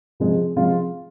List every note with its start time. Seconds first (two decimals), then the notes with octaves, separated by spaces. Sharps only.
0.20 C3 F3 G#3
0.56 C3 F3 G#3 F4